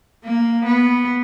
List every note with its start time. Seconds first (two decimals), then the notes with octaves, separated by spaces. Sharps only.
0.24 A#3
0.66 B3